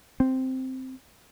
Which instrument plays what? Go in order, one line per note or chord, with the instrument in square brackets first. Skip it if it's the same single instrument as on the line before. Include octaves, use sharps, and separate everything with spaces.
[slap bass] C4